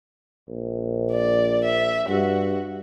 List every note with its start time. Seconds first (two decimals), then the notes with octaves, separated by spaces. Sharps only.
0.48 A#1
1.11 D5
1.64 E5
2.08 G2 F#4